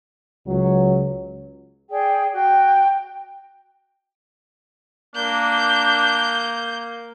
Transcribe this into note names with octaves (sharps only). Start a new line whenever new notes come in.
C#2 F#3
G#4 D5 G5
F#4 G5
A#3 D4 G6